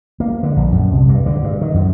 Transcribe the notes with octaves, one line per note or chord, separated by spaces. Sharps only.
A#3
D3
A#1
F#2
C2
G2
D3
G2
D#3
F#2